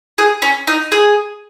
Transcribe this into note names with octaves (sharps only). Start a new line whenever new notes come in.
G#4
C#4
D#4
G#4